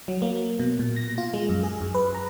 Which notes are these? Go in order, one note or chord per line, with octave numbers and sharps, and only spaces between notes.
F#3
A#3
B2
A#2
A#6
F4
G#3
F#2
G#4
F#2
B4
A#5